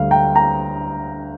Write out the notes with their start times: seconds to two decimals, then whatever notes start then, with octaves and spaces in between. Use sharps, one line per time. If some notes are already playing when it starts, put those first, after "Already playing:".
Already playing: D2 D3 G3 F5
0.11 G5 A#5
0.35 G5 A#5